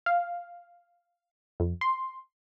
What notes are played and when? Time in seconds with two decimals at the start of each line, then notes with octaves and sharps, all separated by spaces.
0.06 F5
1.60 F2
1.81 C6